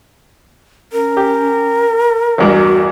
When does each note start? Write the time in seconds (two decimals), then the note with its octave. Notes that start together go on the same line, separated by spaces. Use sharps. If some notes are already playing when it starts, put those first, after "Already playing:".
0.93 C#4 A#4
1.17 G4
2.38 A1 E2 G2 F#4